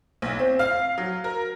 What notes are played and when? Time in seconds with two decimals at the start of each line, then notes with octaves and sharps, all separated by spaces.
0.22 B1
0.39 C4
0.59 F5
0.98 F#3
1.24 A#4